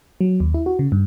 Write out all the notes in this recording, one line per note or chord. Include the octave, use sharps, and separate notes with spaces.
F#3
D#2
E4
F#4
C#3
G2